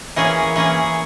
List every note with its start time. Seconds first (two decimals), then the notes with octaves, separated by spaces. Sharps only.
0.16 E3 A#3 C#4 G#4
0.56 E3 A#3 C#4 G#4